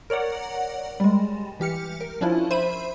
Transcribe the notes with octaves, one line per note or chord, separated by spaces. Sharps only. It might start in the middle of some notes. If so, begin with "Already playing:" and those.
A#4 C#5 D5 F#5
G3 G#3
E3 G4 F6 C#7
A#4
F3 C#4 D4 E4 F4
C5 E5 B5 D#7